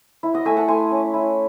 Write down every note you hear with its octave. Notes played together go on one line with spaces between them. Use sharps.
E4
D#5 F#5
A3 E5 G#5
F#5 A5
A3 G#5 C6
C#4
E4